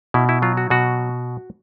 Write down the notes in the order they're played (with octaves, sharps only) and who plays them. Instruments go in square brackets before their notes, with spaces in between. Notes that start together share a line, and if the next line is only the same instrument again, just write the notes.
[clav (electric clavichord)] B2 E4
E4
F#3 F4
F#4
B2 F#4